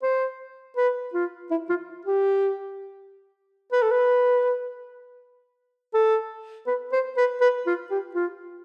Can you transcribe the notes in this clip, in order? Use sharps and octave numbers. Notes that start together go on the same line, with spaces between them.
C5
B4
F4
E4
F4
G4
B4
A4
B4
A4
B4
C5
B4
B4
F4
G4
F4